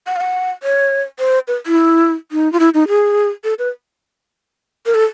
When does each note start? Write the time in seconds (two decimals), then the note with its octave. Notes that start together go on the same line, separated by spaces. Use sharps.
0.07 F#5
0.16 F5
0.21 F#5
0.63 C#5
1.19 C5
1.48 B4
1.66 E4
2.32 D#4
2.53 F4
2.60 E4
2.74 D#4
2.88 G#4
3.44 A4
3.59 B4
4.86 A#4
4.95 A4